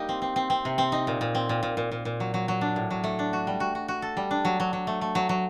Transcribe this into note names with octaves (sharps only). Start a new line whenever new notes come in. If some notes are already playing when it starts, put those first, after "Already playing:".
Already playing: G3 A#3 D#4 G4
C4
C4
C4
C4
C3
C4
D#4
A#2
A#2
C4
A#2
A#2
A#2
A#2
A#2
F#3
F#3
F#3
D4
A2
F#3
A3
D4
F#4
G3
F#4
F#4
F#4
A4
G3
D4
F#3
F#3
F#3
A3
A3
F#3
F#3